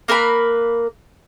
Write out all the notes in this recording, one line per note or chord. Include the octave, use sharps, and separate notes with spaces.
A#3 A#4 B4 B5